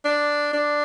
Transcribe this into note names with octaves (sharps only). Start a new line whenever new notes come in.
D4
D4